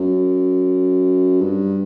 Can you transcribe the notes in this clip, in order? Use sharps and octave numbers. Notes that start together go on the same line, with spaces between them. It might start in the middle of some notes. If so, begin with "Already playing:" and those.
Already playing: F#2
G2